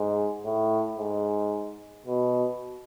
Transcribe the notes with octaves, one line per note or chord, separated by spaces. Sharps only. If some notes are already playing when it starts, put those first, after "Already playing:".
Already playing: G#2
A2
G#2
B2